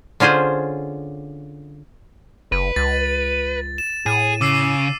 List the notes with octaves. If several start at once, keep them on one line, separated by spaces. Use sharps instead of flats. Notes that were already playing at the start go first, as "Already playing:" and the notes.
D3 C#4 F4 G#4 C5
F#1 B4
C#2 A6
E7
A2 G#4 D#7
C#3 D6 E6 C7